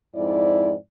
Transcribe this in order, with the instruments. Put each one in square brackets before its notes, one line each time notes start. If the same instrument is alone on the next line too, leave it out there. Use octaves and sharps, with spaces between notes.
[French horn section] F2 G#2 E4 D5